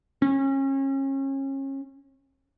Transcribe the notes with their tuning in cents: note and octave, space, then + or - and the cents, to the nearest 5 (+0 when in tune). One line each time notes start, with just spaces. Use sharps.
C#4 -30